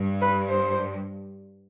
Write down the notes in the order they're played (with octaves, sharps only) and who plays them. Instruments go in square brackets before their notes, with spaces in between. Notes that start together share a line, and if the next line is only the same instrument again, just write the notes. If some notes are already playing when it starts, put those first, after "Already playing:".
Already playing: [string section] G2
[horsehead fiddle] B4
C5